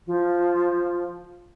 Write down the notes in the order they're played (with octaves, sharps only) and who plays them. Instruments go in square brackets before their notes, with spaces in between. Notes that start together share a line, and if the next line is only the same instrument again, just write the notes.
[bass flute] F3